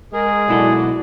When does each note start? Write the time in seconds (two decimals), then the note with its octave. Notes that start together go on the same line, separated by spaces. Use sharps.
0.13 G#3 G#4 A#4
0.48 B1 E4 F#4 A4 D5